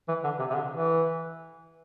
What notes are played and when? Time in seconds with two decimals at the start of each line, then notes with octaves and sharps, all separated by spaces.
0.08 E3
0.24 D3
0.39 C3
0.50 C3
0.55 D3
0.70 E3